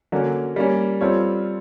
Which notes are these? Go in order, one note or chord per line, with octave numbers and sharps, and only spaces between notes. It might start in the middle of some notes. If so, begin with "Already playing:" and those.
D3 F#3 A#3 C#4
G3 A#3 C#4
G3 C4 F4 A4 C#5